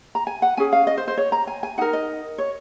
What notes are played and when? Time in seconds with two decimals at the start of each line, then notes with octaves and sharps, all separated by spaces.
0.15 A#5
0.27 G#5
0.42 F#5
0.57 C#4 G#4 G#5
0.73 F5
0.87 D#5
0.97 C5
1.08 C5
1.17 C#5
1.32 A#5
1.47 G#5
1.63 G#5
1.78 D#4 A#4 F#5
1.93 D#5
2.38 C#5